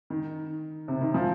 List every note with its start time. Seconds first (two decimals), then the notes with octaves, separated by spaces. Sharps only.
0.10 D#3
0.88 C3
1.01 D#3
1.14 F3